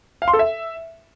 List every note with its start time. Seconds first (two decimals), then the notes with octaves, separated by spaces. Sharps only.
0.22 F5
0.28 C6
0.33 A4
0.39 E5